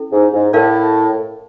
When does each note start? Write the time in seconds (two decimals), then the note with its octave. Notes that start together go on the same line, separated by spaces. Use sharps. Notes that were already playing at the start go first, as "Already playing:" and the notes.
Already playing: C#4 E4 A4
0.12 G#2
0.33 G#2
0.53 A2 A#4 D5 F5